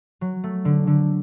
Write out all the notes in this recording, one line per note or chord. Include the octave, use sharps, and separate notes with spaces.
F#3
A3
D3
D3